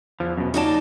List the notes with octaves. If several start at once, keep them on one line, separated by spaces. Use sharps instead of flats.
E2 F3
F#2 B2
C#3 F#3 D#4 F4 D5 A5